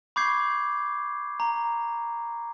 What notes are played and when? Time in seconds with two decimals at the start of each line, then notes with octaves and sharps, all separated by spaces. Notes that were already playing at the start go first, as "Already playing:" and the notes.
0.16 B5 C#6 D6 G6 G#6 C7
1.40 A#5